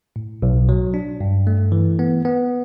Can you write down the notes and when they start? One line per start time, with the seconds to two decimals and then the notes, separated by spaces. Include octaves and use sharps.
0.16 A2
0.42 B1
0.69 F#3
0.94 D4
1.21 G2
1.47 A3
1.72 E3
1.99 B3
2.25 B3